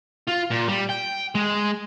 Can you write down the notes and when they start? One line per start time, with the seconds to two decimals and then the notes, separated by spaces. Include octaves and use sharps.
0.28 F4
0.51 A#2
0.69 G3
0.90 G5
1.35 G#3